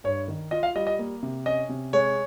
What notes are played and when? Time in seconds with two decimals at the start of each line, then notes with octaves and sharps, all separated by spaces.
0.04 G2 C#5
0.28 D#3
0.51 F4 D#5
0.63 F5
0.75 G3 D#5
0.87 D#5
0.99 A#3
1.23 C3
1.46 C#4 D#5
1.69 C3
1.93 G#3 C#5